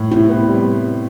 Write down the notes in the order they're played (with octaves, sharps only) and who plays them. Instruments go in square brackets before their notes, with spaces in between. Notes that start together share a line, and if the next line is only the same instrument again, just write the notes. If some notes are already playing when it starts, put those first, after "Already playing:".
Already playing: [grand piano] A2
[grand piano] C3 [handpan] C4 E4
[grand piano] B3
G3